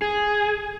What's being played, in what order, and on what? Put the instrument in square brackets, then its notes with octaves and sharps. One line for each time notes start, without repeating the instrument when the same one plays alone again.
[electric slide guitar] G#4